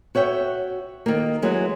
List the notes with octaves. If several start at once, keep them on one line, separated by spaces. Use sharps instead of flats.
F#4 C#5 E5 G5
D#3 A#3
E3 F#3 G#3